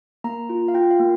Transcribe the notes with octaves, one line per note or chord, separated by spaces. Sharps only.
A#3 A#5
F4
F5
F4 G5
F5
A#3